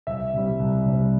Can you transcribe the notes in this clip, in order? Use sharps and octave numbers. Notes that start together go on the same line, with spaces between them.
C2 E5
C3 G3
C2
C3 G3